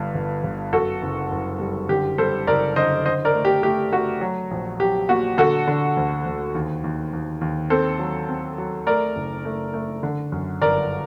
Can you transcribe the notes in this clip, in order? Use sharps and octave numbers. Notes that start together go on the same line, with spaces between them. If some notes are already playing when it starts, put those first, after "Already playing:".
Already playing: G1 G2
G1
G1
F#2 F#4 A4
F#1
F#1
G3
D3 G4
G3 A4 C5
F#1 A#4 D5
D3 C5 D#5
D3 C5 D#5
A#4 D5
A3
G4
A3 G4
A3 F#4
F#3
A#1
F#3 G4
A#2 F#4
D3 F#4 A4
D3
D2
D2
D#2
D#2
D#2
D#2
C4 A4 C5
F#3
C4
F#3
A3 A#4 D5
F#1
A3
A3
D3
F#2
G1 A#4 D5